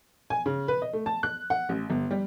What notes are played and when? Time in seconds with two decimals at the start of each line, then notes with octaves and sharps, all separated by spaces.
0.30 G#5
0.46 C#3
0.68 B4
0.82 D#5
0.93 A3
1.06 A5
1.23 F#6
1.50 F#5
1.69 A1
1.90 G1
2.11 G3